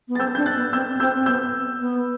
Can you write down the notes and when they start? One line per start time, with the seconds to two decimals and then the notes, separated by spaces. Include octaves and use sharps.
0.08 B3
0.15 A6
0.19 C4 E6 G6
0.35 D4 G6
0.46 F#6 A6
0.56 B3
0.73 C4 E6 G6
1.00 C4 E6 G6
1.26 B3 E6 G6
1.80 B3